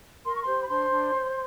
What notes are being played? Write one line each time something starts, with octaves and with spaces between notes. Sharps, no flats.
A#4 C6
C#6
G4 C5 C6
B5
D4 C5 C6
D4
C#5